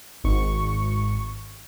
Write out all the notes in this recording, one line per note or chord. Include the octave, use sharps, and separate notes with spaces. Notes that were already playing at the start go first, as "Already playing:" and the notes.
G#1 C#6